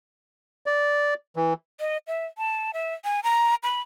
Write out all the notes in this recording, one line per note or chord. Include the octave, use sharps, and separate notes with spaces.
D5
E3
D#5
E5
A5
E5
G#5
A#5
B5